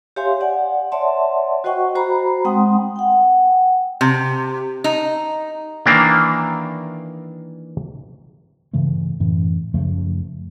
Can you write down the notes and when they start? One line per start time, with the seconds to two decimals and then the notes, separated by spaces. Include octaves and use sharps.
0.16 G4 C#5 E5 F5 G#5 C6
0.40 D5 F#5 G#5
0.92 C#5 D5 E5 F#5 A5 C6
1.64 F#4 C5 D#5 F#5 G5 C#6
1.95 F#4 C5 A#5 B5
2.45 G#3 C4 F#5 G5 C6 D#6
2.96 F#5 G5
4.01 C3
4.84 D#4
5.86 D#3 E3 A#3 D4
8.73 G2 C#3 E3 A3
9.20 F#2 A2 E3
9.74 F#2 C#3 F3 A3